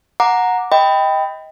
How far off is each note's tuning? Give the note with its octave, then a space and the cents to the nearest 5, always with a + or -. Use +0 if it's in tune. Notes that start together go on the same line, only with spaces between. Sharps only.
F#5 -15 A#5 +0 D6 +0
D#5 +20 G5 +0 B5 +15